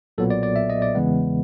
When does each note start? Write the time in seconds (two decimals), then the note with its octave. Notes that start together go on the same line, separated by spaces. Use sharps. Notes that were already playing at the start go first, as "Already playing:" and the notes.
0.18 B1 A#2 F#3 B3 A4
0.30 D5
0.43 D5
0.56 E5
0.70 D#5
0.82 D5
0.95 E2 C#3 E3 G#3 B3